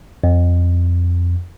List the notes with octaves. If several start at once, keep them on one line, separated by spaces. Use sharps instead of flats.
F2